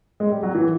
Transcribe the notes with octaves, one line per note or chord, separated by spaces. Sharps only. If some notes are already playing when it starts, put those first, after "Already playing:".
G#3
G3
F#3
E3